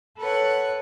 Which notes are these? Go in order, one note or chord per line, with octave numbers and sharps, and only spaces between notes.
A4 B4 C#5 F#5